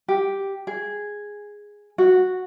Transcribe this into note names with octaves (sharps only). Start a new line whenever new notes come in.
G4
G#4
F#4